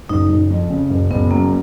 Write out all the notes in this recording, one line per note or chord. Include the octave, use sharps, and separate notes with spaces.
F#1 D#4
F#1
F2
C#3
F#1
F#1 B3
F#2 A#3